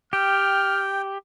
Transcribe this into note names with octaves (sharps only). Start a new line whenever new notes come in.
G4 G5 F6